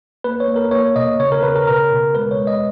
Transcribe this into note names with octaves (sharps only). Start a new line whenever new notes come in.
A#3 B4
C#5
A#3
A#4
A#3 C#5
B2 D#5
C#3 C#5
A#4
C#3 B4
A#4
B2 A#4
B2
G#3 B4
C#5
G#3
D#5